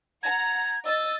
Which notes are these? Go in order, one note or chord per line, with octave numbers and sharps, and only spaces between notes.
F#5 A#5 G#6
D#5 E6 A6